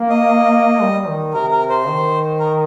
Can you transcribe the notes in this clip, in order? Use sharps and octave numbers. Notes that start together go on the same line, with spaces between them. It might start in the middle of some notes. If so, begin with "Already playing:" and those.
Already playing: A#3
D#5
G3
D#3
C3 A#4
A#4
C5
D#3
A#4